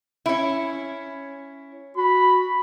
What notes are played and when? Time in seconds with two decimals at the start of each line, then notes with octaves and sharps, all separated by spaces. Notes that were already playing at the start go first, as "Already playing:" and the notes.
0.26 C#4 E4
1.97 F#4 B5